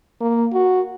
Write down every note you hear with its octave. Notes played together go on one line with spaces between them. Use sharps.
A#3
F#4